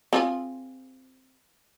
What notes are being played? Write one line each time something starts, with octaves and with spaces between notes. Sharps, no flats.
C4 F4 G#4